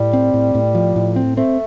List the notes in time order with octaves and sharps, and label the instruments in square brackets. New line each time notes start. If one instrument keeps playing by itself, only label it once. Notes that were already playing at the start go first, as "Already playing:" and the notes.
Already playing: [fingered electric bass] A2 [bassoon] G3
[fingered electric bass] C4
A2
A2
F3
A2
C4
[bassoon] A3 [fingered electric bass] C4